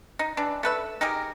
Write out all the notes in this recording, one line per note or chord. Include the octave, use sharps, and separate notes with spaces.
D#4
E3 D4
A3 B4 E5
D#4 G4 G#4 A#4